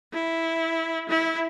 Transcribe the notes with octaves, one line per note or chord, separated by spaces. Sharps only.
E4
E4